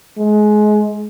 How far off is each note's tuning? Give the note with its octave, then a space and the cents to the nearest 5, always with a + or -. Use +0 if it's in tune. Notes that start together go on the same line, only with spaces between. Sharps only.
G#3 +25